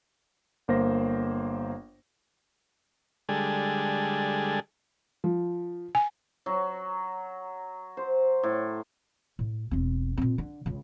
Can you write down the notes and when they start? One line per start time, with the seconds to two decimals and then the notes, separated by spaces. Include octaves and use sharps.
0.68 G1 A#3 C5 A#6
3.29 D3 G3 G#3 G#4 A4
5.24 F3
5.95 G#5
6.46 F#3
7.97 C5
8.43 A2
9.39 A2
9.71 E1 C4
10.17 A#2 C4
10.38 D3
10.66 C#2 C#3